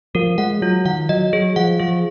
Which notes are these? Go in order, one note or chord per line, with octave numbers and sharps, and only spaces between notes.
F3 A#4
G#3 F#5
F#3 F4
D#3 F#5
F#3 D#5
F#3 G#4
F3 F#5
F3 G#4